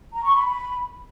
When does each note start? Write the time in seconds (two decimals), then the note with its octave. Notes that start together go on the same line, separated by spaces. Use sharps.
0.12 A#5
0.23 C#6
0.34 B5
0.45 B5